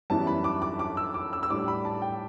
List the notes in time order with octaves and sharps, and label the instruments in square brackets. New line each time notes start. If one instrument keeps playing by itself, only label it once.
[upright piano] F#2 E3 G3 B3 E4 A5
B5
D6
D6
D6
E6
D6
E6
E6
A2 G3 D4 D6
B5
A5
G5